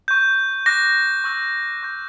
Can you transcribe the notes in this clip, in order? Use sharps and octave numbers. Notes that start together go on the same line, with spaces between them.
C#6 G6
D6 F#6 A#6
C#6 E6 G6
C#6 G6